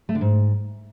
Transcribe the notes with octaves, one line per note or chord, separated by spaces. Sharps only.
A3
D3
G#2